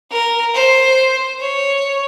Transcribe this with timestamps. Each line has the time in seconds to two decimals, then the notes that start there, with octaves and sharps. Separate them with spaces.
0.11 A#4
0.54 C5
1.41 C#5